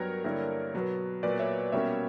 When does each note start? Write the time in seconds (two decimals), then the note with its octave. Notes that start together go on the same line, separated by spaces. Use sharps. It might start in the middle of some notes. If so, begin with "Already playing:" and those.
Already playing: G2 F#3 B3 A#4 C#5
0.24 G2 D3 A#3 E4
0.74 B2 F#3 B3
1.23 A#2 F#3 B3 B4 D5
1.39 C#5 E5
1.72 B2 G3 A#3 C#4 C#5 E5